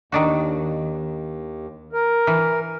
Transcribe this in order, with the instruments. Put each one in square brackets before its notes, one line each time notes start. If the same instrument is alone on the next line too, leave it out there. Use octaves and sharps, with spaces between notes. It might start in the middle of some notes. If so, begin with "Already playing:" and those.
[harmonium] D#2 [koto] D#3 D4 F#4
[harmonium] A#4
[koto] E3